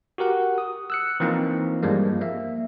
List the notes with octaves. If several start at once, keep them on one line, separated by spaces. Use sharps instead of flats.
F#4 G4 A#4 F#5
D#6
E6 F#6 C#7
E3 F3 A#3 C4 D#4
G2 F3 G3 G#3 A#3
A#3 E5